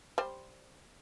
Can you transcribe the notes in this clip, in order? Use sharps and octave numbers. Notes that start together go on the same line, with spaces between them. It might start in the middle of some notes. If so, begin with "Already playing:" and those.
G3 C5